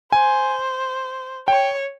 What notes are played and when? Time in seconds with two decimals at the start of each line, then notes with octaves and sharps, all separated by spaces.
0.12 C5 G#5
1.48 C#5 G5